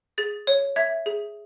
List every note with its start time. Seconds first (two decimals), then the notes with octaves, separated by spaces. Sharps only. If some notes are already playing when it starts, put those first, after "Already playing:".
0.18 G#4 A6
0.47 C#5
0.76 E5 G#6
1.06 G#4